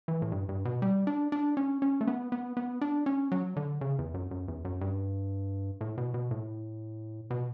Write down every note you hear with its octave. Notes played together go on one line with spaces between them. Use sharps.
E3
A2
G2
G2
B2
G3
D4
D4
C#4
C#4
A3
B3
B3
B3
D4
C#4
F#3
D3
C#3
E2
F#2
F#2
E2
F#2
G2
A2
B2
B2
A2
B2